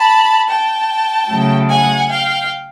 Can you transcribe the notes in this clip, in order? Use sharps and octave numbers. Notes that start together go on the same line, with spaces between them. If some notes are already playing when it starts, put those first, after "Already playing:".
Already playing: A5 B5
G5 A5
C#3 F#3 A3
F#5 G#5
F5 G5